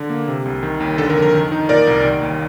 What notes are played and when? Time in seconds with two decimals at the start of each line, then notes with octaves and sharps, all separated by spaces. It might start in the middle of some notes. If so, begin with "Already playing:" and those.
Already playing: D3
0.10 A#3
0.28 C3
0.45 C2
0.63 D#3
0.80 D#2
0.98 D3 A4
1.10 A#4
1.16 F2
1.22 A#4
1.34 D#3
1.52 D#4
1.69 A#2 A#4 D5
1.87 C2
2.05 D#3
2.22 D#2